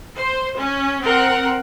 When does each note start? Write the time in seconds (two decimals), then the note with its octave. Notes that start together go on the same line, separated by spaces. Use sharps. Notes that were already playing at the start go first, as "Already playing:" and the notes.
0.17 C5
0.58 C#4
1.02 C4 A#4 F#5